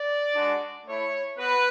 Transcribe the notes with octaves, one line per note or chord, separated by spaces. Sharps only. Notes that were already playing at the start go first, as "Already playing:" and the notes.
Already playing: D5
G#3 D4 F#4
A3 E4 C#5
B3 F#4 B4